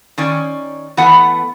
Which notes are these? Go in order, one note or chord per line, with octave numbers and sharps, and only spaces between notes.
D#3 C#4 D5
E3 A3 B3 F#5